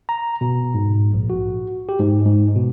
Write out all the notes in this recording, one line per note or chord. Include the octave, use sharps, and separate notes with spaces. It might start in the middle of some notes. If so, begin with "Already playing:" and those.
A#5
B2
G#2
A#1
F#4
G4
G#2
G#2
B2